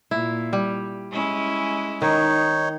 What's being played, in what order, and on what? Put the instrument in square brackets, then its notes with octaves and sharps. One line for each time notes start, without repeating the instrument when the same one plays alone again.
[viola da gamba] A#2 [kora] E4
[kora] G3
[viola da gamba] G#3 C#4 E4
[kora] D#3 [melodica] D#4 C#5